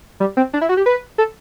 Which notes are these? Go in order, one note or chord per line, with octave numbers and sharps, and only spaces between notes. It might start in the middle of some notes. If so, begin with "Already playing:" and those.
G3
C4
D4
E4
F#4
G4
B4
A4